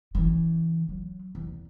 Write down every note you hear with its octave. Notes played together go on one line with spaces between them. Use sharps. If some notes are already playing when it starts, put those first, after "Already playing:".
C#3 E3
F#3
E2